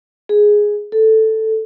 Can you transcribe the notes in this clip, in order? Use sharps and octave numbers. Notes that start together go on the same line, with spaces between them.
G#4
A4